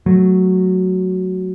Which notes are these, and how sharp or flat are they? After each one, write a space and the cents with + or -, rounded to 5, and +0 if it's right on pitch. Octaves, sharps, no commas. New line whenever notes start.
F#3 +0 A3 +0